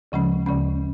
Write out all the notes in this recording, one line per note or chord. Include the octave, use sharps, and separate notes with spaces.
D2 C#3 F3 G#3 C#4
D2 C#3 F3 G#3 C#4